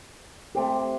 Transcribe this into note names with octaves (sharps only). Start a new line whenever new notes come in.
A3 C4 G4